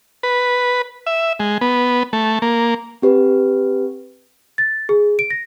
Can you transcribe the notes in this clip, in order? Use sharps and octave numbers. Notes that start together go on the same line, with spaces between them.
B4
E5
G#3
B3
A3
A#3
C4 G4 B4
A6
G#4
D7
A#6